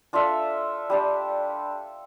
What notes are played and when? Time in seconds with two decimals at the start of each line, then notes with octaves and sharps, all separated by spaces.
0.13 D4 F4 A4 E5
0.90 G3 D4 G4